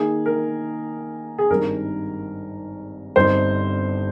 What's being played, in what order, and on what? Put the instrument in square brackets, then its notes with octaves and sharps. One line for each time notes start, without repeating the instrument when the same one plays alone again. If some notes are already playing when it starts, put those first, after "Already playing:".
Already playing: [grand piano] D#3 A#3 D#4 [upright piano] G#4
[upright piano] A#4
G#4
[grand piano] G#1 G2 D#3 [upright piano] A#4
[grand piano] G1 G2 G3 C4 D#4 [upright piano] C5